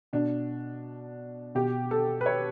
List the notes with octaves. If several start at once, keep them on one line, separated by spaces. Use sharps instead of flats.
B2 D4
B2 G4
A4
B4
C#5